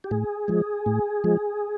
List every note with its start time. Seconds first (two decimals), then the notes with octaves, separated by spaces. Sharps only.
0.04 G4
0.11 A2 G#4
0.48 F3 G#3
0.86 A2
1.24 F3 G#3